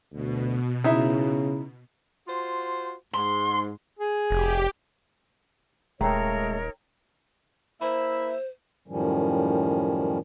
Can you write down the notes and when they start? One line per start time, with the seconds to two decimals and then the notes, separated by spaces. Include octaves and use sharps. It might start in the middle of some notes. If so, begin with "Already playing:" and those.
0.13 D2 B2
0.84 C#3 D#4 E4 E5
2.27 F4 F#4 C5
3.14 G#2 C6
3.99 G#4
4.31 F1 G4
6.01 D#1 G#3 A3 D#4 A#4 C#5 G5 A#5
7.82 A#3 E4 C5 E5
8.88 F#2 A2 D#3 F3 G3 C#4